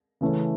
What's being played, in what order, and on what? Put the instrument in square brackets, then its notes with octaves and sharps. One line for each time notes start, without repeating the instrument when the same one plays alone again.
[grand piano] C#3 E3 A3 C#4